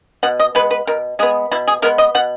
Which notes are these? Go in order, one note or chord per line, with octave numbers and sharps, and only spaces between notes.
B2 F#5
D#5
G#3 B3 B4
B4
B2 A#4
G#3 B3 G#4
B2 E4
G#4
G#3 B3 A#4
D#5
B2 F#5